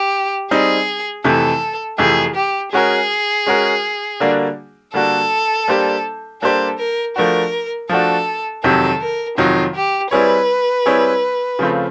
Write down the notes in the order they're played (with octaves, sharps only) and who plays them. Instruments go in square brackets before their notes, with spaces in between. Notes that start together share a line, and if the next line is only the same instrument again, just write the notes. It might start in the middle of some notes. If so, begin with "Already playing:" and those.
Already playing: [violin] G4
[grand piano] G3 C4 D#4 [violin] G#4
[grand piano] F2 C3 E3 A3 [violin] A4
[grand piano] F2 C3 E3 A3 [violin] G#4
[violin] G4
[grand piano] G#3 C#4 F#4 A#4 [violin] G#4
[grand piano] G#3 C#4 F#4 A#4
D3 G3 A#3 D4 F#4
[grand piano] D3 G3 A#3 D4 F#4 [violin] A4
[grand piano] G3 A#3 D4 G4 C5
[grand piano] G3 A#3 D4 G4 C5 [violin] A4
[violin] A#4
[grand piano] F3 A3 D4 F#4 [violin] A#4
[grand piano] F3 A3 D4 F#4 [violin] A4
[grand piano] F2 C3 D#3 F#3 [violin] A4
[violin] A#4
[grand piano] F2 C3 D#3 F#3 [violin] F4
[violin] G4
[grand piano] G3 C4 E4 G#4 C#5 [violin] B4
[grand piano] G3 C4 E4 G#4 C#5
C#3 F3 A3 C4 F4